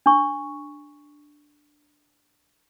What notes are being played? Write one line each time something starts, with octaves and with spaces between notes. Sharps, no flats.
D4 C#6